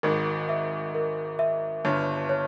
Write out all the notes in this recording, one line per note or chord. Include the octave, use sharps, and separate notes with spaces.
G#1 G#2 A#4
E5
A#4
E5
G1 G2 C#5
C#5